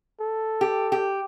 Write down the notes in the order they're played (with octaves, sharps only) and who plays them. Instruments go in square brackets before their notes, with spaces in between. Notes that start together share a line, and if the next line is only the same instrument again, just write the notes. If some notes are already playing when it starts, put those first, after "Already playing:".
[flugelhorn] A4
[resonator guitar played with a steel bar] G4
G4